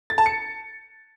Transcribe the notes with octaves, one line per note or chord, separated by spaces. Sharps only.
A6
A5
C#7